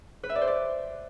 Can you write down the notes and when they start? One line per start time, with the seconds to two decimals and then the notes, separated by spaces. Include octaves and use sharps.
0.24 B4
0.30 E5
0.35 D5
0.41 C5
0.47 D5